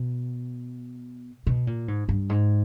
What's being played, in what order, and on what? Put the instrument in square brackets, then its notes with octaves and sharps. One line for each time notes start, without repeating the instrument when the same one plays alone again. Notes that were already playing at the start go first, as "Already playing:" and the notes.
Already playing: [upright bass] B2
B2
A#2
G#2
G2
G#2